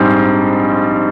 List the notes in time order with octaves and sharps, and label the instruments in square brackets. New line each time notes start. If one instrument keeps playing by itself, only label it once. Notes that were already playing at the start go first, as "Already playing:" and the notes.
Already playing: [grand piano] A#1 G#2 G3 C4